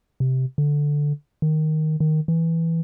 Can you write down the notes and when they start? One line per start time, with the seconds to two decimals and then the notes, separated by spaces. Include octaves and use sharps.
0.20 C3
0.58 D3
1.42 D#3
2.00 D#3
2.28 E3